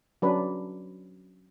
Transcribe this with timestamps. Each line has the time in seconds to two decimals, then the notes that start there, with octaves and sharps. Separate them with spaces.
0.22 F#3 C#4 D4 B4